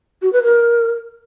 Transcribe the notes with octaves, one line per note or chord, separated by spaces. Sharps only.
F#4
B4
A#4